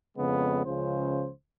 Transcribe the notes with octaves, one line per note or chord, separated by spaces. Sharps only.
F2 C#3 G#3 B3
C#2 C#3 F3 C5